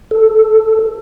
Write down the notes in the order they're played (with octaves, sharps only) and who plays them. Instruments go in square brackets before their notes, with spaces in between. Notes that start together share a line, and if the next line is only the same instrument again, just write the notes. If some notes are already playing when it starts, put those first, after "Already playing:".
[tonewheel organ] A4